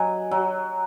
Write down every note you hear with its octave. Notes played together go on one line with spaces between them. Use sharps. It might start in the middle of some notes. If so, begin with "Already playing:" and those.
Already playing: F#3 D#5 G#5
F#3